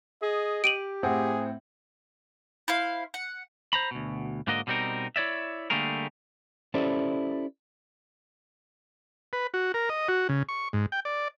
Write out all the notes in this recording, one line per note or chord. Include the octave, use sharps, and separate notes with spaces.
G#4 D#5
G4 D7 D#7 F#7
A2 C4 G#4 F#5
E4 C5 F5
F#5
C5 A#5 B5
D2 B2
G#2 D3 A#3 F#4 A#4 D#5
B2 G3 C4 D#4 A#4
E4 C#5 D5 E5
D3 G3 A3 A#3 G#4 A#4
C#4 E4 G4 A4 C5 D5
B4
F#4
A#4
D#5
F#4
C#3
C#6
G#2
G5
D5